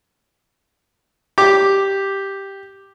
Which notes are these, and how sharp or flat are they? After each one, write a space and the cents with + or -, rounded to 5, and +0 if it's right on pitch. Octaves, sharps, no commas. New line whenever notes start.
G4 +0 D6 +0